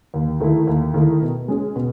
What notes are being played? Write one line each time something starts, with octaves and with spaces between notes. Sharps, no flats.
D#2
D#3 A3 E4
D#2
D#3 A3 E4
B2
G#3 C#4 G#4
B2